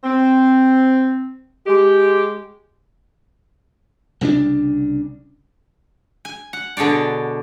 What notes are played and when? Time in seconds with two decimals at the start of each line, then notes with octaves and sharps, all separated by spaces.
0.04 C4
1.66 G#3 G4
4.21 C2 C#3 G#3 D4
6.25 G#5
6.53 F#5
6.77 B2 D3 G#4 C#5 D5